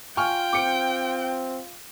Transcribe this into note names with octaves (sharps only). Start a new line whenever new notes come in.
F4 G5 G#5 C#6 F6
C4 D6 C#7 D7